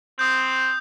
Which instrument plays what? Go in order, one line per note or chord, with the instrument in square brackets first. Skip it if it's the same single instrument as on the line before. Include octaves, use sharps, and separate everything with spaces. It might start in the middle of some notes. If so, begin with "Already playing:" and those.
[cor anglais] C4 [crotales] D#6 G6